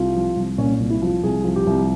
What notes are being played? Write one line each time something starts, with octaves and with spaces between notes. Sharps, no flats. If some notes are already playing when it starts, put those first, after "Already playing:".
Already playing: C2 F4
F3
C2
A#2 C#4
C2
E4
F3
F4
C2 G#4
F3
G4
C2